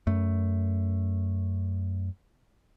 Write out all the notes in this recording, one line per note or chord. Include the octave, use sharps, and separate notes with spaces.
F#2 A3